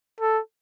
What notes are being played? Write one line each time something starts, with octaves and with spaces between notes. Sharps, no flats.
A4